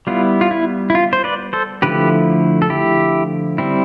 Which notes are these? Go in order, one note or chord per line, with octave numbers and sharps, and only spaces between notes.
G3 B3 E4 F4
F4
E4
E4
F4
C5
B4 D5
A4 C5
D3 F3 A3 E4 G4 B4
A4
E4 G4
G3 C4 E4